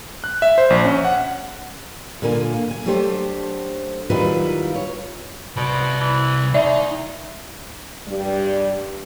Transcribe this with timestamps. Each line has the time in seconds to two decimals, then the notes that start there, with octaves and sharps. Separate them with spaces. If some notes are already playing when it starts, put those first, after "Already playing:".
0.24 F#6
0.42 E5
0.58 C5
0.70 A#1
0.85 C#4
1.05 F#5
2.22 A#2 D3 A#3 F4 G#5
2.71 G#5
2.86 F#3 A3 D4 G4 C5
4.10 D#3 F#3 G3 E4 F4 B4
4.75 C#5
5.56 C2 B2 D5
6.01 E3
6.54 D#2 D#4 D5 E5
8.08 G2 G3